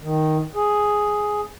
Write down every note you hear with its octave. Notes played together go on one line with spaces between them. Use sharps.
D#3
G#4